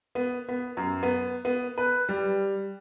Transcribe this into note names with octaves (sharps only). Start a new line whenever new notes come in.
B3
B3
F#2
B3
B3
B4
G3